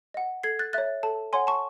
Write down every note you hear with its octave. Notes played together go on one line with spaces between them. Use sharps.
D#5 F#5
A4 G#6 C7
F#6 A6
C#5 E5 F#6 A6
A4 A5
C#5 F#5 G#5 C6
A5 C#6